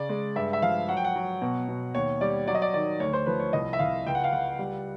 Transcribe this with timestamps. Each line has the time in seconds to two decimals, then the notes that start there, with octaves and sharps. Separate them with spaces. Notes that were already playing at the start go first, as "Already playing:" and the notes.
Already playing: C#3 D5
0.09 G#3
0.36 G2 E5
0.53 E5
0.62 F3 F5
0.88 F#3 F#5
0.97 G5
1.05 F#5
1.15 F#3
1.41 B2
1.68 B2
1.94 D#2 C#5
2.21 G3 D5
2.47 F#3 D5
2.55 D#5
2.62 D5
2.74 D#3 D5
3.00 D2 C#5
3.13 C5
3.26 F3 B4
3.40 C#5
3.53 C2 D#5
3.73 E5
3.79 C2 F5
4.06 C#2 G5
4.15 F#5
4.24 F5
4.32 C#2 F#5
4.59 G3